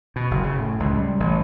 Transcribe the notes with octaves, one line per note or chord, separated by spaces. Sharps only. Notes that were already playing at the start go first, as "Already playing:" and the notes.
B2
F#1
C#3
A2
C#2
G3
A1